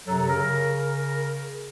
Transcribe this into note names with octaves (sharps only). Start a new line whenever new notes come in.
F#2 C3 F#3 A4 A#5
C#3 A#4